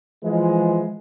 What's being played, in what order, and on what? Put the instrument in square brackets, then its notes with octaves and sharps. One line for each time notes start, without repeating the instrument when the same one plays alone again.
[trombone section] E3 F3 G#3